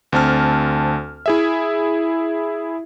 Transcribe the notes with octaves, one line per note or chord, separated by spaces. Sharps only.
D2 C4 A5 F6
E4 G#4 E5